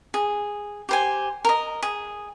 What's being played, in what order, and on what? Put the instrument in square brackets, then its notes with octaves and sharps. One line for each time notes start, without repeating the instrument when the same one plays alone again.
[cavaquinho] G#4
G4 C5 G#5
A#4 D#5
G#4